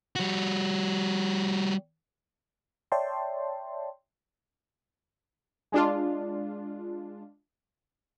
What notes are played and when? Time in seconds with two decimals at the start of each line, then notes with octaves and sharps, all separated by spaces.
0.16 G3 F#4
2.92 C#5 D5 E5 G5 A5 C6
5.72 G#3 D4 F4